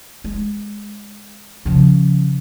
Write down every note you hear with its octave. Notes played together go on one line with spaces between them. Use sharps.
G#3
C#3 F3